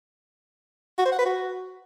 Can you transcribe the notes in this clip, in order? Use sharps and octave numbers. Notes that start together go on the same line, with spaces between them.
F#4
C5
F#5
B4
F#4